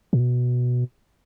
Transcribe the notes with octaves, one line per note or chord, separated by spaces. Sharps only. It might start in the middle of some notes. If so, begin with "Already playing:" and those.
A#2
B2